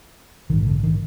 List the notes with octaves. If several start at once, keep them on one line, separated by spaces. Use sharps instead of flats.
A#1 G#2 D#3
D3
D#3